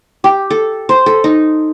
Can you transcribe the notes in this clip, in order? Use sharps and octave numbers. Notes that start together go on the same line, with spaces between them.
G4
A4
C5
A4
D#4